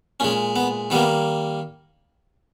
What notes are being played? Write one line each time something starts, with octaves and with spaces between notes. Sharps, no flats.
A#2 G#3 C#4
B3
D#3 G3 A#3 B3